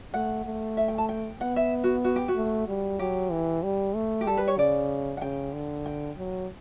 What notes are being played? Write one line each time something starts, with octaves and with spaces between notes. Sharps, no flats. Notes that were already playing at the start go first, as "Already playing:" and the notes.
A3 F#5
A3
E5
G5
A5
G5
B3 F#5
E5
F#4
F#4
G4
F#4
A3
G3
F#3 G4
E3
G3
A3
G4
G3 A4
B4
C#5
C#3 D5
F#5
C#3 G5
D3
G5
F#3